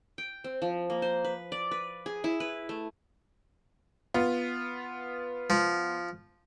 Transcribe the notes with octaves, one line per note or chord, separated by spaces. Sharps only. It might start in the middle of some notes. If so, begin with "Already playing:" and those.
G5
C4
F3
A#3
C5
B4
D5
B4
G#4
E4
B4
A3
B3 F4
F3